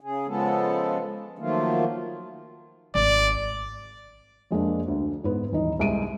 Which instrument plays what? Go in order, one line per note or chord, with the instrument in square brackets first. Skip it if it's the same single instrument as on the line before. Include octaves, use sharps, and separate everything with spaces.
[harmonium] C#3 G#4
C#3 F3 G#3 B3 A4
D#3 F3 F#3 A3 A#3 F4
[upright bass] G#1 [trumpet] D5
[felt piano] F2 G#3 A#3 D4
D2
G#2 B3
D#1 E3 D#4
C2 G#3 D7 D#7